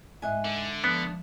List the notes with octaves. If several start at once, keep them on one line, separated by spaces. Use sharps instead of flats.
G#2 G#3 D#5 E5 G#5 F#6
D3
F3 B3 D4